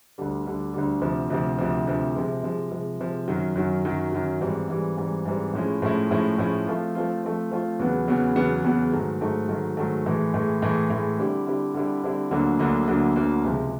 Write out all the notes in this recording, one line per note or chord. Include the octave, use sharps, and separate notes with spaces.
D2 D3 G3
D2 D3 G3
D2 D3 G3
D2 C3 F3
D2 C3 F3
D2 C3 F3
D2 C3 F3
C3 F3 G#3
C3 F3 G#3
C3 F3 G#3
C3 F3 G#3
F#2 D#3 F#3
F#2 D#3 F#3
F#2 D#3 F#3
F#2 D#3 F#3
G#2 E3 G3 C4
G#2 E3 G3 C4
G#2 E3 G3 C4
G#2 E3 G3 C4
A2 F3 G#3 C#4 E4
A2 F3 G#3 C#4 E4
A2 F3 G#3 C#4 E4
A2 F3 G#3 C#4 E4
F3 A3 C4 F4
F3 A3 C4 F4
F3 A3 C4 F4
F3 A3 C4 F4
E2 C#3 F#3 B3
E2 C#3 F#3 B3
E2 C#3 F#3 B3
E2 C#3 F#3 B3
G#2 D#3 F#3 A3
G#2 D#3 F#3 A3
G#2 D#3 F#3 A3
G#2 D#3 F#3 A3
A2 E3 G#3
A2 E3 G#3
A2 E3 G#3
A2 E3 G#3
D3 G3 C4 E4 G4
D3 G3 C4 E4 G4
D3 G3 C4 E4 G4
D3 G3 C4 E4 G4
D2 D3 F#3 A#3
D2 D3 F#3 A#3
D2 D3 F#3 A#3
D2 D3 F#3 A#3
C#2 C3 F3 G#3